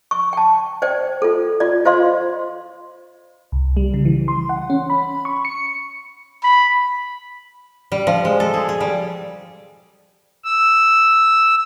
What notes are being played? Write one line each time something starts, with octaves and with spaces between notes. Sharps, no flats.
C#6
G5 A5
C5 D5 G5
F4 A4
F4 D5
F4 C5 D#5 F5 C6
C2
G3
C#3
E3
C6
F#5
C#4
B5
C#6
C#7
B5
G3
F3
G#3
A4
G#4
G#4
G3
E6